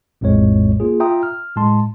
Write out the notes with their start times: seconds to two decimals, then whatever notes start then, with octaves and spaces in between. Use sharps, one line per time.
0.21 A#1 F2 A2 G#3 C#5
0.80 A#3 F4 G#4
1.00 F4 E5 G5 A#5 D#6
1.23 F6
1.56 A2 G#3 A5 C6